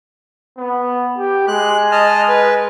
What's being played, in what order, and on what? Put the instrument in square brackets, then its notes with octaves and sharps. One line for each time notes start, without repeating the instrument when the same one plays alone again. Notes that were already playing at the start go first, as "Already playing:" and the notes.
[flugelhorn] B3
G4
[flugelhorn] G#3 [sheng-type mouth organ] F#6
[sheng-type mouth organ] D#5 A5 F6
B4